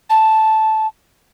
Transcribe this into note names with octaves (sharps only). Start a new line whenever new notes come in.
A5